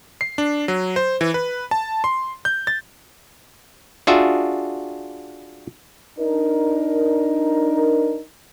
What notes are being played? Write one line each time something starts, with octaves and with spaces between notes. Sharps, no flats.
C7
D4
F#3
C5
E3
B4
A5
C6
G6
A6
D4 F4 F#4 G#4 E5
D4 D#4 A#4